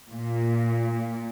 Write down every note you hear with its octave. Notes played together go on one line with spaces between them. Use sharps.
A#2